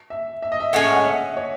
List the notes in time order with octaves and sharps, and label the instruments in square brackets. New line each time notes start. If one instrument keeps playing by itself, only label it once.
[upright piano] E5
E5
D#5
E5
[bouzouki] A2 G#3 C#4 [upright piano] F#5
[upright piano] F#5
E5
C#5